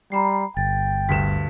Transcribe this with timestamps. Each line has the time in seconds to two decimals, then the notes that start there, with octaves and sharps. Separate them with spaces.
0.12 G3 A#5 B5 C7
0.57 G1 G5 A6
1.09 D2 G2 B6 E7